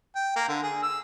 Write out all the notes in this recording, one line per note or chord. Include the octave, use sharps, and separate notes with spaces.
G5
A#3
D3
G#4
E6